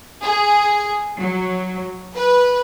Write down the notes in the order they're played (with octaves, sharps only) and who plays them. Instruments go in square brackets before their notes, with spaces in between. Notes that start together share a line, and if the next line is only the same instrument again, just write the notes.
[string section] G#4
F#3
B4